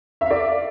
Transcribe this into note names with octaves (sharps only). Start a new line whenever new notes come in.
D5 E5 F5